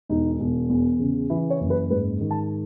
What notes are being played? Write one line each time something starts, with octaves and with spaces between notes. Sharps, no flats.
E1 D#4
E1
E2
C#3
E3 E4
C#5
F#1
B4
G#2 B4
D#3
A5